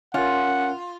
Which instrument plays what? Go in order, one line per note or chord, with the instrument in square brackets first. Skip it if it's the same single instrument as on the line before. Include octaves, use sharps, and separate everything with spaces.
[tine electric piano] C#4 A#4 [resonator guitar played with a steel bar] F4 [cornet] F#5